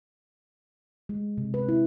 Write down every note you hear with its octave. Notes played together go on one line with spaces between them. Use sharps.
G#3
C3
B4
E4